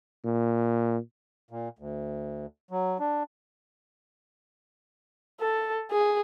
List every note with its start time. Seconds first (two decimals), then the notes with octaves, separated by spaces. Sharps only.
0.25 A#2
1.51 A#2
1.79 D2
2.71 F#3
3.00 D4
5.41 A4
5.91 G#4